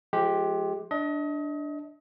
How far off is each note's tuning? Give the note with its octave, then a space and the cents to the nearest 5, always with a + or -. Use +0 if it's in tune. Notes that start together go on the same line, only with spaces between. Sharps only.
F3 +0 G#3 +30 G4 +0
D4 +0 D#5 +35